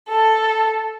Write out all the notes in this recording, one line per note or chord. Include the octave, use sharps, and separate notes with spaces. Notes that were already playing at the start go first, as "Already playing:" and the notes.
A4